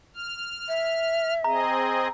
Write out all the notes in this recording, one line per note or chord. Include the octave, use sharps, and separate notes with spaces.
F6
E5
C4 G#4 D#5 A#5